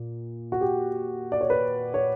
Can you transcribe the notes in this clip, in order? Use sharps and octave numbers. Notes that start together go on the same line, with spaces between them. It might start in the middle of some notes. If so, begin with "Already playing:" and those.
Already playing: A#2
F#4
G4
D5
C#5
B4
C#5